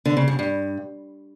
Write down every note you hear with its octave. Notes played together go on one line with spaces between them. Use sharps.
D3
C#3
G2
G2